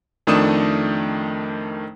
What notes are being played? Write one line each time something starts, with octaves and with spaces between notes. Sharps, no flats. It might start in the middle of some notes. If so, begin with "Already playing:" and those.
F2 D#3 A3 D4 D#6 E7